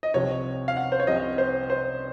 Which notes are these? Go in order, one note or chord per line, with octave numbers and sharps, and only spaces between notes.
D#5
C2 C3 F3 C#5
F5
F#5
C5
C#5
C2 C3 F3 D#5
C5
C5